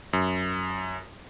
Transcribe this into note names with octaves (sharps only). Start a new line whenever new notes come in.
F#2